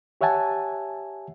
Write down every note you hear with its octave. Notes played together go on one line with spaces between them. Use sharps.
G4 C#5 E5 F#5 G#5 A5